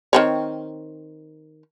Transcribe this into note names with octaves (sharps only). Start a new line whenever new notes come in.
D#3 C4 C#5